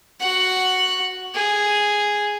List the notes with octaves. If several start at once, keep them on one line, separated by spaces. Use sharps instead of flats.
F#4 F#5
G#4